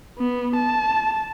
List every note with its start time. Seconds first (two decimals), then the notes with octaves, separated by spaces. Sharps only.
0.19 B3
0.56 A5